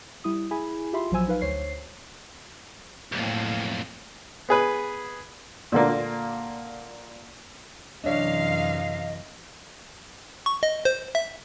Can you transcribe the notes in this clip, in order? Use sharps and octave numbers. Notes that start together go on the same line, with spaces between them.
G3 E4 D#6
E4 G#4 G#5 B5
F4 G4 E5 B5 C6
A#1 F3 F#3 C5 G#5 E6
D#4 B4 F5
D2 C5 C#5 C7
B1 F2 A2 A#3
B3 G#4 B4
A#2 D3 A#3
F#2 C3 E3 D4 C#5 D#5 F5
C#6
D#5
C5
E5